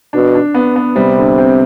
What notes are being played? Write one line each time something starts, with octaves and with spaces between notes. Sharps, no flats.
B2 D4
D4
B3
B3
C3 G3
D3
C4